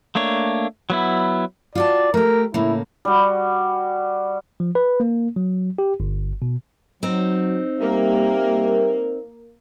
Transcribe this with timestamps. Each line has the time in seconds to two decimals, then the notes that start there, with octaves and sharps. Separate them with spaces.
0.15 A3 A#3 D4 C#5
0.90 F#3 B3 E4
1.75 F4 F#4 D5 A5
2.14 A3 G4 A#4
2.54 A2 C#3 A#3 E4
3.05 G3 F#4
4.60 F3
4.75 B4
5.00 A#3
5.36 F#3
5.78 G4
6.00 G1
6.42 B2
7.03 F#3 C4 D#4
7.80 G3 A#3 G4 A#4 E5